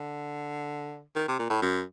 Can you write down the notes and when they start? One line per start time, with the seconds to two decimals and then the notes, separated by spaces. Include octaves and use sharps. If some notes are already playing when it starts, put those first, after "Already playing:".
Already playing: D3
1.16 D#3
1.28 C3
1.39 A#2
1.50 A2
1.62 F#2